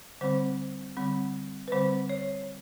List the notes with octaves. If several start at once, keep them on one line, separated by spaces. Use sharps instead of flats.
D3 G3 C4 C5
D3 G3 C4
B4
D3 G3 C4 C5
C#5